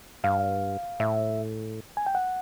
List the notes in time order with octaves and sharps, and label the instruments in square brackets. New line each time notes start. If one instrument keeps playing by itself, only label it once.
[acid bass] G2 [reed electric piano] F5
[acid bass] A2 [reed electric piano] E5
[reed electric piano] G#5
G5
F#5